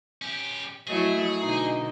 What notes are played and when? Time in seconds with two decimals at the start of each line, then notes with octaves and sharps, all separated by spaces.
0.22 C#4 G4
0.87 F#3 A3 E4 G#4 D#5
1.40 B2 D3 D#4 D#5